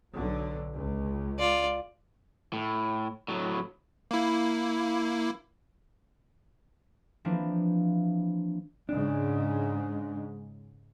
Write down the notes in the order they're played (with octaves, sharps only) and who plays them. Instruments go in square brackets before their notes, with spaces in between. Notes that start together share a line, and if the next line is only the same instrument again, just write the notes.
[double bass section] B1 D3 F#3
C#2
[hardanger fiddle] F4 D5
[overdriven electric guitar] A2
A2 F#3
[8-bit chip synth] A#3 E4
[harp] E3 F3 A#3 C4 D4 E4
[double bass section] G#2 C#3 G#3 [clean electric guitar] D4